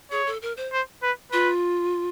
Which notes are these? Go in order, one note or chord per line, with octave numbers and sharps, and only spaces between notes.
G#4 C#5
A4
A#4
C5
C5
B4
F4 B4